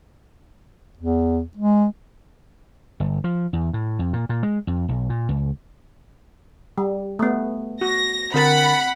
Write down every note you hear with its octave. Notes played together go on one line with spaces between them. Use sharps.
E2
G#3
G1
F3
E2
A2
F2
A#2
A#2
G#3
F2
B1
A#2
C#2
G3
A3 B3
F#4 A#6
D3 C4 A#4 F#5 B5 A6